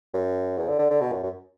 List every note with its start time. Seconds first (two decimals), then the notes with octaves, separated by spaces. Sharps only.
0.14 F#2
0.57 E2
0.69 D3
0.79 D3
0.90 D3
1.01 B2
1.12 F#2
1.23 F#2